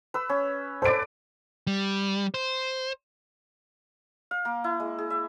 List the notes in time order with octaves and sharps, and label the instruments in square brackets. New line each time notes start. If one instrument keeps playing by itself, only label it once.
[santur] B4 E6
C#4
[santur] A4 B4 D5 [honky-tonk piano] C5 D7
[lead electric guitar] G3
C5
[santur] F5
A#3
E4
G#3
G#4
E5